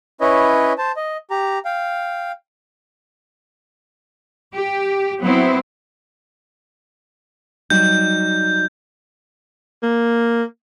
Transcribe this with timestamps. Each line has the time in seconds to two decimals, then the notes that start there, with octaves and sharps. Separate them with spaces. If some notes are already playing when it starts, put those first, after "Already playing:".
0.21 C#4 E4 B4 C#5 D#5
0.78 C5 A5
0.96 D#5
1.30 G4 A#5
1.65 F5 G5
4.55 G4
5.22 F#3 B3 C4 E4
7.70 F#3 G3 D#4 G6
9.83 A#3